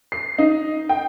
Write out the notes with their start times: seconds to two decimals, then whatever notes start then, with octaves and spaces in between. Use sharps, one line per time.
0.12 C7
0.38 D#4
0.89 G5